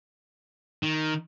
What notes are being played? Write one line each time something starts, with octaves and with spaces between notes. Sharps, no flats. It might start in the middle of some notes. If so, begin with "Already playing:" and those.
D#3